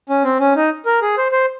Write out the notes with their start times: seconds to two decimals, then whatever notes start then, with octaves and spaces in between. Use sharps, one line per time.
0.09 C#4
0.24 C4
0.40 C#4
0.56 D#4
0.86 A#4
1.02 G#4
1.18 C5
1.32 C5